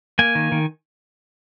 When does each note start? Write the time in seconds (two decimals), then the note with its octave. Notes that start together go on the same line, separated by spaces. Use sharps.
0.19 A#3 G#5
0.35 D#3
0.52 D#3